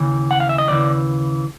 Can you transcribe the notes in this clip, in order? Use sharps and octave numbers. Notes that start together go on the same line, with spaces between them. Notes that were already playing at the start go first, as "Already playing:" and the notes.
Already playing: D#2 C#3 E3
F#5
F5
E5
D#5
D#2 C#3 E3 D5